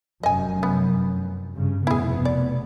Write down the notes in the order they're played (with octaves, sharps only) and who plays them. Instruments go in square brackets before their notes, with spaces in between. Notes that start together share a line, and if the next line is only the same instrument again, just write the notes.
[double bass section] F1 F#2 [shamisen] D#5 G#5
[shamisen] B3
[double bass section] G2 C#3
[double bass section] F1 B2 B3 [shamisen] E4 G#4
[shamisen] D5